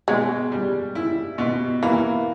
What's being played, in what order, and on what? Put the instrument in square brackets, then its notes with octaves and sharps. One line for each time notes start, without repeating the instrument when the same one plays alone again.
[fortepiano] B2 [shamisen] G#3
[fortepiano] G3
E4
B2
[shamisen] E3 [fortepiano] A#3